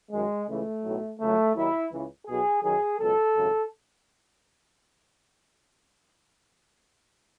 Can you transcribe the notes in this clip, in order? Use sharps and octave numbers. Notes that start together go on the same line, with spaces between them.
F#2 D#3 F#3 G#3
C#2 C#3 E3 A3
B1 A2 F#3
C#2 C#3 F#3 A3
D#2 D#3 F#3 E4
C#2 C#3 E3
B1 B2 F#3 G#4
F#2 D#3 F#3 G#4
C#2 B2 F#3 A4
G#1 F#2 C#3